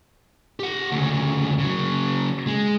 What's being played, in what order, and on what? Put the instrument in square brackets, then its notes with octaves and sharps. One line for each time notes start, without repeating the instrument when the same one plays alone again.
[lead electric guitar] G4 F#5
D2 C#3
C#3 F#3
G#3